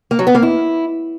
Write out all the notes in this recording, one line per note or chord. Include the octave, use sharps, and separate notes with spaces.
A#3
F#3
B3
A#3
E4